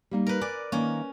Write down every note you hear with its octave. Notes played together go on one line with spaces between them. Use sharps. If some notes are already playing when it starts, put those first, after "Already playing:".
G3 A#3 D#4
A#4 B4
D5 G#5
D#3 A#3 C#4